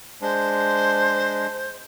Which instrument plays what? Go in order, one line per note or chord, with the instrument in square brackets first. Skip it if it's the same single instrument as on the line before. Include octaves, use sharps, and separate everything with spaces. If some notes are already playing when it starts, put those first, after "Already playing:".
[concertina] G#3 D4 [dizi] C5